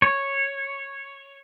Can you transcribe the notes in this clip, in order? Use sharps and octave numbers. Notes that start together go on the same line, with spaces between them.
C#5